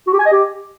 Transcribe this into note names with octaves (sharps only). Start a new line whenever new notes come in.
F#4
G4
G#5
D#5
G4